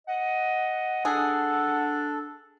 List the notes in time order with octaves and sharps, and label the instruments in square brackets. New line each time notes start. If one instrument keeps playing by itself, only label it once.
[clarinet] D#5 [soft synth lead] F#5
[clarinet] D4 [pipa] G#4 [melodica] A4